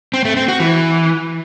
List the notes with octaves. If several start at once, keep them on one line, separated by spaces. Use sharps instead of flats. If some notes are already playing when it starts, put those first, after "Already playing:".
C4
A3
C4
F#4
E3